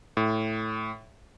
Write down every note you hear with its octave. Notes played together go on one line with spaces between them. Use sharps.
A2